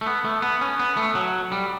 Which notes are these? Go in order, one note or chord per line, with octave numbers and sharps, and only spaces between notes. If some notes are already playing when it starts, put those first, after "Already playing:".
A3
B3
A3
B3
C#4
B3
A3
F#3
G3